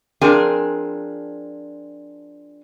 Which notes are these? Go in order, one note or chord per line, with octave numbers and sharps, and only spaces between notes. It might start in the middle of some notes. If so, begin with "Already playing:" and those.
F3 C4 D4 G#4 A#4 G#5